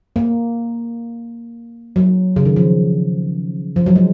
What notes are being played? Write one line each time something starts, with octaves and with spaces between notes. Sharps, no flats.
A#3
F#3
C#3
D#3
F3
F3
F#3
G#3